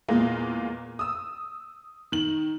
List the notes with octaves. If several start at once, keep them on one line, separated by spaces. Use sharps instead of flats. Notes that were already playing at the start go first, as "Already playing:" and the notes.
E2 A#2 G#3 A#3
D#6 E6
D#3 F#7